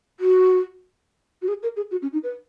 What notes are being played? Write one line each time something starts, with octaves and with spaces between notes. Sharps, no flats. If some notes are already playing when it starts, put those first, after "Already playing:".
F#4
F#4
G#4
A#4
G#4
F#4
C#4
D#4
B4